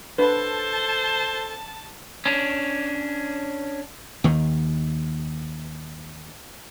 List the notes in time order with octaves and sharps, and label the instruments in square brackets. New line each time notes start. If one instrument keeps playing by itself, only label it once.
[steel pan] D4 B4 [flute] A4 [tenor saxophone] C5 [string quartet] A5
[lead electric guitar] C#4 D4
[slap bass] D#2 D#3